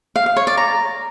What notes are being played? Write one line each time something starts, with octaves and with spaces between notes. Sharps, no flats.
F5
F5
C#5
D5
A#5